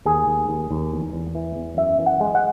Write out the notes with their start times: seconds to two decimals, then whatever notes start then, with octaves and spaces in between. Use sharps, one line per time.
0.06 D#2 G#4
0.27 D#2
0.49 D#2
0.71 D#2
0.92 E2
1.13 E2
1.35 E3
1.56 E2
1.77 F#2 E5
1.98 E3
2.06 F#5
2.21 G#3
2.35 F#5